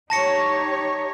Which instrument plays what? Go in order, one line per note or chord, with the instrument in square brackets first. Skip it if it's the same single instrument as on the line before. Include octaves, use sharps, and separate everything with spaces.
[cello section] D#4 G4 C#5 [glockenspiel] A5 A#6 C#7